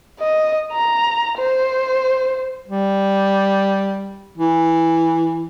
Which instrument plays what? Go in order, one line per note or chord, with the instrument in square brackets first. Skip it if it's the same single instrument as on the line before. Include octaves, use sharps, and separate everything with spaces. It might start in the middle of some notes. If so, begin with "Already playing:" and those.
[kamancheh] D#5
A#5
C5
[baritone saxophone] G3
E3